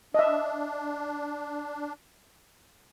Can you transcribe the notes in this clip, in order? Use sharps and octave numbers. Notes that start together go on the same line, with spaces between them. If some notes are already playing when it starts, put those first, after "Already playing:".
D4 D#5 E5